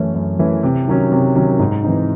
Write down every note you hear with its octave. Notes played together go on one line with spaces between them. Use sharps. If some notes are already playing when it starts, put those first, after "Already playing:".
Already playing: F#2 E3 A3 C#4 E4
F#2
E3 A3 C#4 E4
C3
D#3 F#3 C#4
C3
D#3 F#3 C#4
G#2
E3 C4 D#4